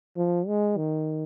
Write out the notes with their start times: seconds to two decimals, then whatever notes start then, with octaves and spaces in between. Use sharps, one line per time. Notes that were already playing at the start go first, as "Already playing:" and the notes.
0.17 F3
0.47 G#3
0.77 D#3